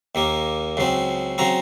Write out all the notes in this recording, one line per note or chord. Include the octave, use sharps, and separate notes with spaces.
D#2 D#3 A#3
C#2 C#3 F#3 C4
C#3 F#3 C4 A#5